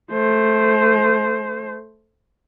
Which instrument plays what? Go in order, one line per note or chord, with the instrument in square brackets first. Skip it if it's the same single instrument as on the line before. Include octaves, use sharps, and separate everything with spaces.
[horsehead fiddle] A3 C5